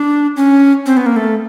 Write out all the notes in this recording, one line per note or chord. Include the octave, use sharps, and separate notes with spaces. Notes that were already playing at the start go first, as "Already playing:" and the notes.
Already playing: D4
C#4
C4
B3
A#3
A3